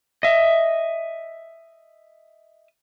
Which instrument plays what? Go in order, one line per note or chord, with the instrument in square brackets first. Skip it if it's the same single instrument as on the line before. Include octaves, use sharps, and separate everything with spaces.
[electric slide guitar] D#5 E5